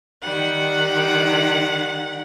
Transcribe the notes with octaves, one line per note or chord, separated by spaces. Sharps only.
D#3 G3 F#5